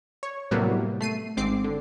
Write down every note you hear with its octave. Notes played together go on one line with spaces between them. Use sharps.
C#5
A2 C3 F#3 G3 A#3 B3
A3 C7 D#7
G#1 G#2 C4 D6 C7
D3